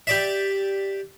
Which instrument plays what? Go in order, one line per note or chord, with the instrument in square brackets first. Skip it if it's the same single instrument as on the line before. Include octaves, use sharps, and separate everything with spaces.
[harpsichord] G4 D5 E5